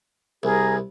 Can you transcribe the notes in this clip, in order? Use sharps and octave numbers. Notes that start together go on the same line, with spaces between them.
C2 G#4 A#4